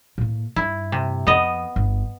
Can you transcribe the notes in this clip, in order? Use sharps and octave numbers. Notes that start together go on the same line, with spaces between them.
A2 A#3
G2 E4
C3
F2 B3 D#5
G1